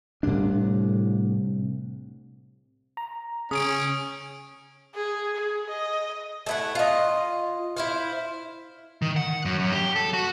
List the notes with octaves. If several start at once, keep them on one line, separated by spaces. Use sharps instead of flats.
C2 A2 D4
A#5
C#3 C#4 D#6 D7
G#4
G#4
D#5
A3 E4 F#5
F4 D#5
E4 C5 F5
D#3
F#5
F#2
F#2
G4
A4
F#4